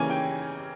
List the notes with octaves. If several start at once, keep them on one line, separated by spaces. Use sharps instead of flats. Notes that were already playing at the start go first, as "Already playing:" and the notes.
Already playing: C#3 E3 A#3 C#4 G#5
G5